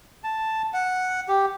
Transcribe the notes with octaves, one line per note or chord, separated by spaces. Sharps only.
A5
F#5
G4